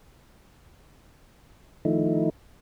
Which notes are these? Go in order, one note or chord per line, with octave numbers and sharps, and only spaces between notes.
D#3 F3 A3 D#4 E4